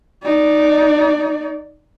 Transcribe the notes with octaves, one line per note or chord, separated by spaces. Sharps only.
D#4 D5